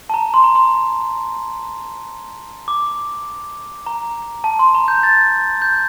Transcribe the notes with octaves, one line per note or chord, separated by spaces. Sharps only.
A5
A#5
C6
A#5
C6
D6
A#5
A5
C6
A#5
G6
A6
G6